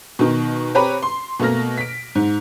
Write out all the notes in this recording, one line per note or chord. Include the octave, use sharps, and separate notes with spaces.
B2 D#3
C4 G4 B4 C#5 A#5 B5
C6
B2 A3 A#3 F6 A#6
B6 D7
G#2